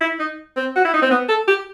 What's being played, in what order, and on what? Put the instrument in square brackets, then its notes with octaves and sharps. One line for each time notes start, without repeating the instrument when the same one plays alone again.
[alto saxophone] E4
D#4
C4
F#4
E4
D#4
C4
B3
A4
G4